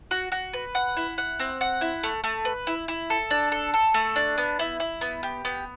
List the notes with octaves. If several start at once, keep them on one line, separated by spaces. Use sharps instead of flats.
F#4
F#4
B4
F#5
E4
F#5
C4
F#5
E4
A3
A3
B4
E4
E4
A4
D4
A4
A4
A3
D4
B3
E4
E4
B3
G4
B3